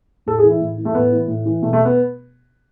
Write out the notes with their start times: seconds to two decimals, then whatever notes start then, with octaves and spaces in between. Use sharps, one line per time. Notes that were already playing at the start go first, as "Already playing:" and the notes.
0.26 A2 A4
0.38 G#4
0.43 E3
0.50 E4
0.60 A2
0.78 E3
0.85 A3
0.94 A2 B3
1.12 E3
1.28 A2
1.45 E3
1.62 B2 A3
1.73 A3
1.85 B3